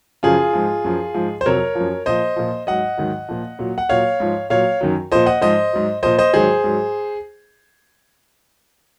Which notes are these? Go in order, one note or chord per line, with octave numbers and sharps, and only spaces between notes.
F#2 C#3 F3 F4 G#4
G#2 F3
F#2 F3
G#2 F3
C5
F2 C3 F#3 A#4 C#5
F#2 F3
A#2 F3 C5 D#5
A#2 F3
G#2 F#3 D#5 F#5
G#2 D#3 F#3
A#2 F3
A#2 F#3
F#5
A#2 F#3 C#5 F5
G#2 F3
A#2 F#3 C#5 F5
F#2 D#3 F#3
A#2 F3 C5 D#5
D#5 F#5
G#2 F3 C5 D#5
G#2 F#3
A#2 F3 C5 D#5
C5 D#5
G#2 D#3 F#3 G#4 C5
G#2 F#3